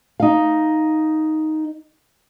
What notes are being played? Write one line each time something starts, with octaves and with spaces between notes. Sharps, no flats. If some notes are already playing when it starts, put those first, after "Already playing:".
D#4 F5